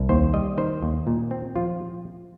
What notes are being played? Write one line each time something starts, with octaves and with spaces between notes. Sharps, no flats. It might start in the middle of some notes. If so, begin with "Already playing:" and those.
Already playing: C2
D#2 C5
G3 D#5
D#3 C5
D#2
A#2
C4
F3 F4